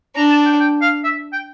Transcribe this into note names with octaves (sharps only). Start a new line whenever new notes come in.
D4 A#5
A5
G5
G5
F5
E5
G5